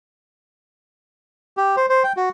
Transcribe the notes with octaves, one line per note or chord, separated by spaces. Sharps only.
G4
C5
C5
G5
F#4